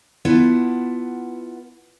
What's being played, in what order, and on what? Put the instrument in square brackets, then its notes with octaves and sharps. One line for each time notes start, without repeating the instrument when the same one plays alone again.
[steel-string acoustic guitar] B3 E4 F4 B4 F#5 A5